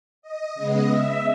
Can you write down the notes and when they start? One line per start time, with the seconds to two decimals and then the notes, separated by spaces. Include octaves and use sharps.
0.22 D#5
0.55 C#3 G#3 B3 D#5
0.88 E5